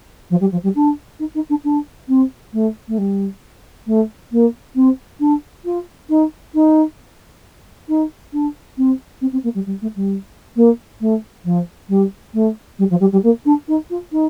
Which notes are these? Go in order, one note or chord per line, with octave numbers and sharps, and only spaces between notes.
F3
G3
F3
G3
D4
D#4
D#4
D4
D4
C4
A3
A3
G3
A3
A#3
C4
D4
F4
D#4
D#4
D#4
D4
C4
C4
C4
A#3
G3
G3
A3
G3
A#3
A3
F3
G3
A3
G3
F3
G3
G3
A#3
D4
D#4
F4
D#4